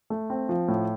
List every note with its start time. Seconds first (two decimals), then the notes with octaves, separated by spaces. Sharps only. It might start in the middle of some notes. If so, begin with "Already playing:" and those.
0.10 A3
0.30 C4
0.49 F3
0.68 A2